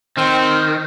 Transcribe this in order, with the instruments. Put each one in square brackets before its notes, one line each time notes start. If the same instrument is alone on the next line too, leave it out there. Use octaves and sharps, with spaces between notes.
[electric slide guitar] D#3 [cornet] C4